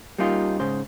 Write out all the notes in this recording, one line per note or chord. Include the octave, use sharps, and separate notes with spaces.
G3 A#3 C#4 D#4 F4
G#2 C#3 C5